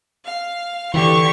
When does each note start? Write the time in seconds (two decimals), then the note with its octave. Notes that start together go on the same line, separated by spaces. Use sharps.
0.24 F5
0.94 D3 E3 G4 C#6